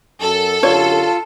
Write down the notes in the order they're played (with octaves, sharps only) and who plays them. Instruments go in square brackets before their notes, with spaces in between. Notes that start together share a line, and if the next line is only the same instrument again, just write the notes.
[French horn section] F#2 [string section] A4
[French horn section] F#2 D3 G4 [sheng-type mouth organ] F4 [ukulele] C#5